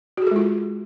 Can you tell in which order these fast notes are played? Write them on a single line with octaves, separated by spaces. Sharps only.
F#4 G#4 A4 G#3 F4